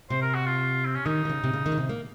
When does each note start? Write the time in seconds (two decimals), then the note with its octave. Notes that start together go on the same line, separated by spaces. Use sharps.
0.10 C3 C5
0.22 A#4
0.34 F#4
0.46 F4
0.85 C4
0.96 C#4
1.06 D#3 D#4
1.25 D#3
1.29 C#3
1.44 C3
1.53 C#3
1.66 D#3
1.72 C#3
1.78 C3
1.89 A#3